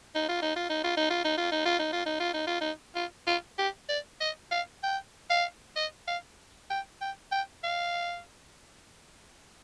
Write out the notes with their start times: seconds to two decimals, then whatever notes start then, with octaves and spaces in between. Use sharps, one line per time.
0.15 D#4
0.28 F4
0.42 D#4
0.56 F4
0.70 D#4
0.84 F4
0.97 D#4
1.10 F4
1.24 D#4
1.37 F4
1.51 D#4
1.65 F4
1.79 D#4
1.92 F4
2.06 D#4
2.20 F4
2.34 D#4
2.47 F4
2.61 D#4
2.95 F4
3.27 F4
3.58 G4
3.89 D5
4.20 D#5
4.52 F5
4.83 G5
5.30 F5
5.76 D#5
6.08 F5
6.70 G5
7.01 G5
7.32 G5
7.63 F5